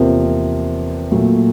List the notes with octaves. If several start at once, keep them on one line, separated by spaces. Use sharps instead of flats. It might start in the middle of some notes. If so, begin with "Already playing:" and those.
Already playing: E2 C3 F3 A#3
A#2 F#3 A3